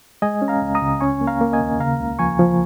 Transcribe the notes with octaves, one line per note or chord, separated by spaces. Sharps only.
G#3 D#5 G#5
C#4
F5 A#5
C#2
A#5 D#6
C#2
C#4 G#5 C#6
A#3
F5 A#5
A#3
D#5 G#5
D#2
C#3 F5 A#5
C#2
F3 G#5 C#6
F3